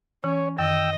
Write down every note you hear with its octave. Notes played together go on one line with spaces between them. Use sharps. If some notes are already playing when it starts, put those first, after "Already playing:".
E3 C#4 C#5
F#2 D#3 D#5 G5 E6